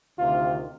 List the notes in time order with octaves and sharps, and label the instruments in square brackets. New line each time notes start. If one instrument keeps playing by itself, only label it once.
[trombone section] D2 C3 D#3 F4